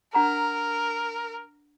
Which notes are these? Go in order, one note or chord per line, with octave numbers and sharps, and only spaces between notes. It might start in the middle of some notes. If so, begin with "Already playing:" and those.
D4 A#4 F#5 A#5